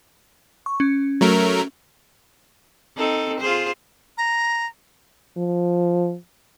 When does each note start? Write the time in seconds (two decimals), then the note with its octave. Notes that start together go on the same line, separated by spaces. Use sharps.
0.66 C#6
0.80 C#4
1.21 F#3 A3 A#4
2.97 C4 D#4 A4
3.40 F4 G#4 C5
4.18 A#5
5.37 F3